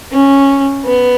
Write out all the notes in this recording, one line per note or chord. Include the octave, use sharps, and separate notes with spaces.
C#4
B3